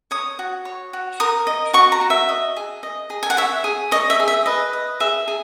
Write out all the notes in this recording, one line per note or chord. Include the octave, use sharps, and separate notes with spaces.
C#5 D#6
F#4
C#5
F#4
A#4 D#6
D#5
F#4 C#6
A#5
F#4
E5
D#5
G#4
D#5
G#4
G#5
F#5
C#5 E5
G#4
C#5 D#5
E5
G#4
E5
B4 D#5
D#5
G#4 E5
G#4